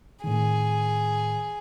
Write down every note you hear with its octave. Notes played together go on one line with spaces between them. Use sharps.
A2 D#3 G#4